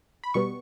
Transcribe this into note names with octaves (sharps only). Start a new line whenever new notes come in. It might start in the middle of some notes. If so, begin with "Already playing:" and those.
B5
B2 G3 B3 C#6